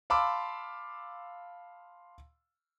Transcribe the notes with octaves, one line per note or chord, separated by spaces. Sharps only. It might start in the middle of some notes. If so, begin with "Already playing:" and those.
F5 A5 B5 C6 D6 E6